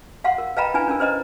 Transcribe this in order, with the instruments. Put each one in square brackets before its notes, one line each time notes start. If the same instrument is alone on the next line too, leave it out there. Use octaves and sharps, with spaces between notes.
[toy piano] F5 F#5 C6
A#4
B4 D#5 F5 G5 A#5 B5
D4 E4 B4 G#5
C#4 D4 A#4
B4 C5 D#5 A#5